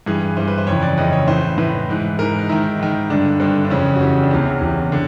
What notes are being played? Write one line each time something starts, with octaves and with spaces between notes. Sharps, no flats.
G2 E3 G#4
G2 E3 C5
B4
C5
F2 C#3 E3 C#5
D5
F2 C#3 E3 D#5
C#5
A2 E3 C5
A2 E3 B4
G#2 E3
G#2 E3 A#4
D#4
G#2 D#3 E4
G#2 D#3
G2 D3 D4
G2 D3 C4
D4
F2 C#3 E3 C#4
F#4
F2 C#3 E3 G4
D4
E2 C3 E3 C#4
E2 C3 E3
D3